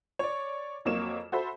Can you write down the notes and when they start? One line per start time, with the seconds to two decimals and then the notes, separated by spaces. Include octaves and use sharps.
0.19 C#5 D5
0.85 F2 F#3 A#3 C#5 E7
1.32 F#4 A4 C5 E5 B5